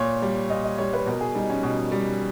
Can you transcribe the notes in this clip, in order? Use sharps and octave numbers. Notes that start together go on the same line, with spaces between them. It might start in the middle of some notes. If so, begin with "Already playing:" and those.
Already playing: A#2 C#5
G3
A#2 D#5
D#5
G3 C#5
B4
B2 A#4
G#4
G3 D#4
C#4
B2
G3